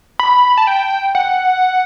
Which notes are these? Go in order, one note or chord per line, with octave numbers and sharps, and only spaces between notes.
B5
A5
G5
F#5